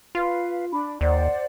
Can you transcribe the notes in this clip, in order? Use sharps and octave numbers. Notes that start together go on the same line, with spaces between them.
F4 B4 F5
D4 B5
D#2 C5 D5 F#5